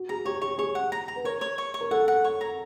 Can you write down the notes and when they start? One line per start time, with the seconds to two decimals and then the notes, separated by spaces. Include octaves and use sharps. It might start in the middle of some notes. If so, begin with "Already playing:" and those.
Already playing: F#4
0.09 G#4 A#5
0.25 G4 C#5
0.41 G4 C#5
0.58 G#4 C#5
0.75 F#5
0.92 A#5
1.08 A#5
1.16 B4
1.24 A#4 C#5
1.41 C#5
1.58 C#5
1.74 C#5
1.81 A#4
1.91 A4 F#5
2.08 F#5
2.24 C#5
2.41 A#5